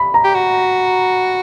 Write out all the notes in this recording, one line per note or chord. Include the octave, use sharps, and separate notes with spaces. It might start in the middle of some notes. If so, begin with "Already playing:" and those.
Already playing: B5
A#5
G4
F#4